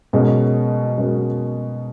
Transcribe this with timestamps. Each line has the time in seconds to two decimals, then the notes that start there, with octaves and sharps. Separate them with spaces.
0.13 B2 G#3 C#4 F#4 A#4
0.97 B2 G#3 C#4 F#4 A#4